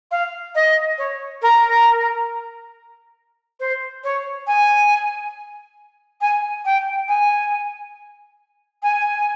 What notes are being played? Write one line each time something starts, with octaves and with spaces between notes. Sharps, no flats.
F5
D#5
C#5
A#4
C5
C#5
G#5
G#5
G5
G#5
G#5